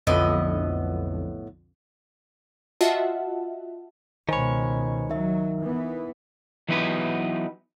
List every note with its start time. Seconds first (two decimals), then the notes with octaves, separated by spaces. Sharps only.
0.07 B1 F2 A2 D3 B3 D#5
2.81 F4 F#4 D#5 E5 F#5 A5
4.29 C#2 B2 D#3 C5 C#5 G#5 B5
5.10 F#3 D#4 A#4 E5
5.60 E3 B3
6.69 E3 F#3 B3 D#4 G4 B4